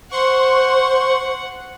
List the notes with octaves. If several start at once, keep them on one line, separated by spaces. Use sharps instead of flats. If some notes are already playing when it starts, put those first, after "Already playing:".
C5 F#5 C6 C#6